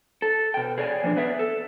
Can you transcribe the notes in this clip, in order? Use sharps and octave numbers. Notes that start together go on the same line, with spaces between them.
A4
B2 G5
G#4 C#5 D5 G#5
E2 A#2 F3 G#3 D4
B3 G#4 B4 D5 E5
A4